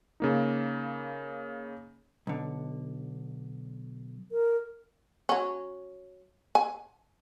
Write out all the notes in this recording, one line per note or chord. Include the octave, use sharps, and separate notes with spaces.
C#3 A#3 D#4
B1 D3
A#4
F#3 C#4
G#5